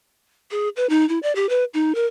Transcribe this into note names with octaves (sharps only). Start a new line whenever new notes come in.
G#4
B4
D#4
E4
D5
G4
B4
D#4
A#4